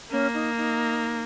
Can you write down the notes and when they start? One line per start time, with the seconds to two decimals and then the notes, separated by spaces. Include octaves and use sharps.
0.10 A#3 C#4
0.33 D#4
0.57 D#4